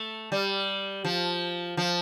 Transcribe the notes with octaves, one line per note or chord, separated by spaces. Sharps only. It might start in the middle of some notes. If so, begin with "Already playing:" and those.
Already playing: A3
G3
F3
F3